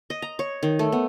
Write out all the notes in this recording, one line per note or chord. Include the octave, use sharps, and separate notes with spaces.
D#5
A#5
C#5
D#3
A3
B3